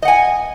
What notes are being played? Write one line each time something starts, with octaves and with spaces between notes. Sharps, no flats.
D#5 F#5 G#5